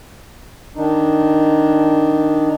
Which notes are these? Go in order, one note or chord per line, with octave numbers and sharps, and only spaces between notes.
D#3 D4 D#4